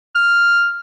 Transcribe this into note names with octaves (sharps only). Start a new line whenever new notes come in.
F6